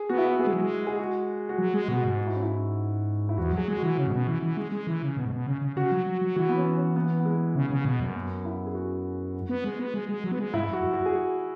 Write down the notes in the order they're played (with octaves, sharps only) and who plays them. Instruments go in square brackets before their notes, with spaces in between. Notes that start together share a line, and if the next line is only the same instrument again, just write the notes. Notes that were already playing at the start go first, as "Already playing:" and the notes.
Already playing: [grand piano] G#4
[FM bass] B3 [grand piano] F#4
[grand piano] E4
F#4
[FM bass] B3 [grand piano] G#4
[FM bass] G#3
F#3
G#3
[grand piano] G#4
F#4
F#4
[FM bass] F#3 [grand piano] G#4
[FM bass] G#3
[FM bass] B2 [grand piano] F#4
[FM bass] G#2
[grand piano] F#4
E4
C#4
E4
E4
[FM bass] E2 [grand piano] F#4
[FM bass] F#3 [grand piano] G#4
[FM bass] G#3
[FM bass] E3 [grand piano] F#4
[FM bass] C#3 [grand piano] C#4
[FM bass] G#2
B2
E3
E3
G#3
G#3
E3
C#3
B2
G#2
B2
C#3
C#3
[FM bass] C#3 [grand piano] F#4
[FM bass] F#3
F#3
F#3
[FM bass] E3 [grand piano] F#4
[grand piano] B3
C#4
C#4
B3
B3
G#3
[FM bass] C#3
C#3
B2
F#2
[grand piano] B3
E4
G#4
F#4
[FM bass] B3
G#3
B3
G#3
G#3
F#3
B3
G#3
[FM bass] G#2 [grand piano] E4
[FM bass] F#2 [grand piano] F#4
[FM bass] F#2
[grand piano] F#4
G#4
F#4